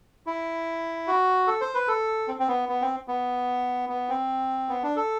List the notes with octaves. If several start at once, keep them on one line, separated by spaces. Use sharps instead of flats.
E4
F#4
A4
C5
B4
A4
C4
C4
B3
B3
C4
B3
B3
C4
B3
D4
A4